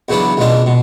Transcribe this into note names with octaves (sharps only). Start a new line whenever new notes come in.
E2 C#3 F#3 B3 D4
C#2 B2 G#3 D4
B2